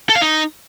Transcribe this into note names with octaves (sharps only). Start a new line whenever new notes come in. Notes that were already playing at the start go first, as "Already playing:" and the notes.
A4
F5
D#4